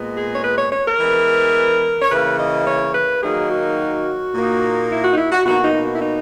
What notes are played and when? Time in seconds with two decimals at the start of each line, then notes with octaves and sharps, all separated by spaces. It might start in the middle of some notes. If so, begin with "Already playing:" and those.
Already playing: A#2 G#3 B3
0.16 G#4
0.35 C#5
0.44 B4
0.58 C#5
0.72 C#5
0.86 A#4
0.99 E3 G#3 B3
2.02 C#5
2.11 C#3 E3 A#3 B4
2.39 D#5
2.67 C#5
2.95 B4
3.23 D#3 F#3 A#3 D#4 G#4
3.51 F#4
4.34 A#2 A#3 D#4
4.90 E4
5.04 F#4
5.12 D#4
5.18 E4
5.32 F#4
5.46 B2 A#3 D#4 F#4
5.64 D#4
5.95 E4
6.02 D#4